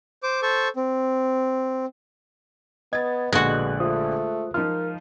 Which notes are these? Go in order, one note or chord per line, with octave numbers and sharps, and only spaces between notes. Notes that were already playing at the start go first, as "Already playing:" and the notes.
C5 D6
A4 C5 C#6
C4
B3 D#5 G#6 A6
A#1 B2 D3 G#3 F#4 F#6
A3 F4 C5 D#6
F3 D#4 F4 A#4 F6